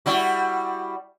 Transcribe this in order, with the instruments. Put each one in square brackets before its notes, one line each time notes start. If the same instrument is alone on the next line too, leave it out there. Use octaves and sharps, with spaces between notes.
[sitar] G3 E4 F#4